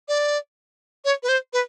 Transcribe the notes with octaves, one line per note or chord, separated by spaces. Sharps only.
D5
C#5
B4
C5
B4